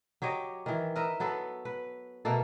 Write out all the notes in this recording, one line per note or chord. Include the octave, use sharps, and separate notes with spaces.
F#3 G4 C#5 D#5
D#3 E3
A#4 B4 D#5 E5
F#3 B3 A4 B4
B4
B2 A3 A#3 A4